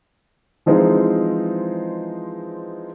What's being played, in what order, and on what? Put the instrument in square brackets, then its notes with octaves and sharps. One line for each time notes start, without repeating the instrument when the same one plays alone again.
[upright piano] E3 F3 G#3 C4 D#4